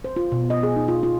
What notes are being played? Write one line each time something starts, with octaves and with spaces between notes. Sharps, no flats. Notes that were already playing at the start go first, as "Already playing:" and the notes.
C5
F4
B2
D#5
G#4
D#4
F4
F4